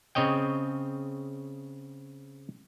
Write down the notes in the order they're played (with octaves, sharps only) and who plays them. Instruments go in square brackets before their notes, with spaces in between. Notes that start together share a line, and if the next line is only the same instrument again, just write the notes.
[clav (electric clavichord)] C#3 C4 C#5 D#5 G5